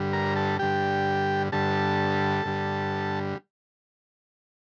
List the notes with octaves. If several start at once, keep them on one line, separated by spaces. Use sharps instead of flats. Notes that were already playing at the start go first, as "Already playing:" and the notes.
Already playing: G2 D3 G3
A#4 A#5
A4 A5
G2 D3 G3 G4 G5
G2 D3 G3 A4 A5
G2 D3 G3